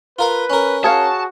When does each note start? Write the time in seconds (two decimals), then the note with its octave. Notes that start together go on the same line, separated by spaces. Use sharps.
0.19 F4 A#4 B4 F5
0.50 C#4 A#4
0.84 F#4 G#4 C#5 F5 A5